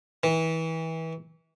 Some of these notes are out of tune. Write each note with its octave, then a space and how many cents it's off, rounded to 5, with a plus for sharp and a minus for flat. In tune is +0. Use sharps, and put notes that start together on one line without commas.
E3 -30